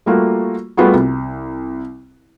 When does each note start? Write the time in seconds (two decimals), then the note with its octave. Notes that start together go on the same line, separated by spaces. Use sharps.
0.06 G3 A3 A#3 F4 F#4
0.77 G3 A3 B3 F4 F#4 G#4
0.93 C2